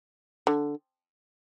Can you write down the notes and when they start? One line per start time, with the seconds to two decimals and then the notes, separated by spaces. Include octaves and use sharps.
0.47 D3